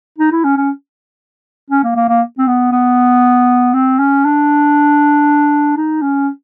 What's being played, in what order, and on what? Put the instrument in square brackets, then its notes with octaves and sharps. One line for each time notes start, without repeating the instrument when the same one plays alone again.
[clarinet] D#4
E4
C#4
C#4
C#4
A#3
A#3
A#3
C4
B3
B3
C4
C#4
D4
D#4
C#4